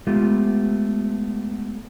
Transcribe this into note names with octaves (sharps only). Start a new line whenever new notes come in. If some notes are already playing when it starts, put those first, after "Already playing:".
G#3 A3 B3 F4 G4